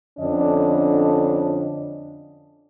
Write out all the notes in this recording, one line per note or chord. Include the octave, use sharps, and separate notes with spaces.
F2 D3 C#4 D4 D#5